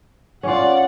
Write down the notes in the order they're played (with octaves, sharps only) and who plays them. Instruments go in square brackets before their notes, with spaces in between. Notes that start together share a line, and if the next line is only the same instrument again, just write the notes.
[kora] C#4 F4 [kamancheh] D5 F#5